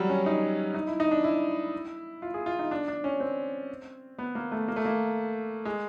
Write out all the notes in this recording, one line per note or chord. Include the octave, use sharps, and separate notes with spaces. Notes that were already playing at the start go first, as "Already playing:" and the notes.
Already playing: F#3 G3
C#4
D#4
D#4
E4
D#4
D4
E4
F4
G#4
F4
D#4
D4
D4
C#4
C4
B3
A#3
A3
A#3
A3
A#3
G#3